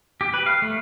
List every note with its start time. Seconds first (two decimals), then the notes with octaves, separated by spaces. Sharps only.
0.21 G4
0.34 B4
0.46 F5
0.62 A3